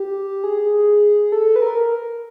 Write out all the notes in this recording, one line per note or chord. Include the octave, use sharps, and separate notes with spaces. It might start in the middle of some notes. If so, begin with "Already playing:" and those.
Already playing: G4
G#4
A4
B4
A#4